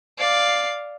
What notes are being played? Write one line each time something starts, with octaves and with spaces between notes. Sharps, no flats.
D5 F5